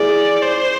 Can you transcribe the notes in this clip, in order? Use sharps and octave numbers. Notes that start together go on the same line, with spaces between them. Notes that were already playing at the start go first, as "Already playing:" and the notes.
Already playing: E4 G#4 D5
C5